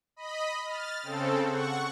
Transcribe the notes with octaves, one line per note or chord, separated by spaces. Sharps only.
D#5 B5
F6 A6
C#3 C4 A4
F#5 C#6